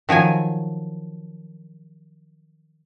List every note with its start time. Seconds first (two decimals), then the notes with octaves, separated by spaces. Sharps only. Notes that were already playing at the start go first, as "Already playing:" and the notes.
0.09 D#3 F3 F#3 G#5